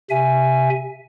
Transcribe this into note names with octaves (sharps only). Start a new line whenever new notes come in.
C3 E5 G#5